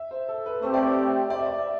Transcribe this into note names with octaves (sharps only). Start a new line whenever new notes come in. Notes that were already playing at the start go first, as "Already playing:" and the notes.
Already playing: E5
C5
A4
B4
A3 C4 G4 C5
D5
E5
D5
E5
D5